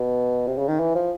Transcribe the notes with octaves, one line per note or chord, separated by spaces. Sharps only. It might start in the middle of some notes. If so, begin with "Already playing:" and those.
Already playing: B2
C3
C#3
D#3
E3
F3